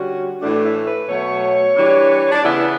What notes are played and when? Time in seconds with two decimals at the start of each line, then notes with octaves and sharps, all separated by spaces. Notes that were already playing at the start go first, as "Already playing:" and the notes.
Already playing: D3 G3 C#4 F#4
0.41 A2 E3 A3 D4
0.63 E4
0.85 B4
1.09 B2 F#3 A3 C#5
1.76 E3 G3 D4
2.32 D4
2.44 C#3 E3 B3 E4